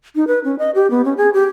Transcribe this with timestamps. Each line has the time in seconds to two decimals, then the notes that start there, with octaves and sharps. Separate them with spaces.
0.16 D#4
0.27 B4
0.44 C#4
0.59 D#5
0.75 G4
0.91 B3
1.05 C#4
1.17 G#4
1.34 G4